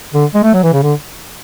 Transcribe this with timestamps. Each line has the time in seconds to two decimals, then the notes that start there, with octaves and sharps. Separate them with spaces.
0.14 D3
0.34 G#3
0.44 A3
0.54 F#3
0.63 E3
0.73 C#3
0.83 D3